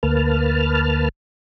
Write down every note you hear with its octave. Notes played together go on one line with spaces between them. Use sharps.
D2 A#3 B4 A5 F6